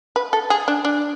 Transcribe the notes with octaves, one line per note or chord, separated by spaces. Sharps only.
B4
A4
G#4
D4
D4